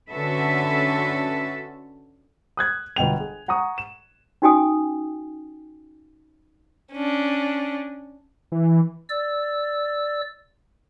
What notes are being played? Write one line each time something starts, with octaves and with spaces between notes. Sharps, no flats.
D3 C#4 F#4 A4 B4 E5
D#6 F#6 G#6
G1 B2 G5 F7
G#4
F#5 A#5 C#6 D#6
E7
C#4 D#4 F#4 G5 G#5 D#6
C#4 D4
E3
D5 E6